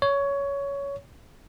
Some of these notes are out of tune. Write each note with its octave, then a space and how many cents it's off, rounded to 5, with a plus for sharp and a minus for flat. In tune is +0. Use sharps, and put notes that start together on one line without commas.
C#5 +15